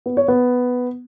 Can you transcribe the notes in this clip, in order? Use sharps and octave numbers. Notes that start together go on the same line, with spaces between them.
B3
C#5
B3